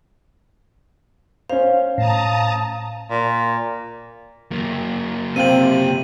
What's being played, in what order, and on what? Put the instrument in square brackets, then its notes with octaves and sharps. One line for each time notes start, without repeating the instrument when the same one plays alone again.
[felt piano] C#4 C5 [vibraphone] F5
[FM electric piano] A2 [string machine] A5 A#5 D#6
[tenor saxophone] A#2
[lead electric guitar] F#2 A#3
[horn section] C3 [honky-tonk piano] C4 F4 G5 [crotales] D#7 F#7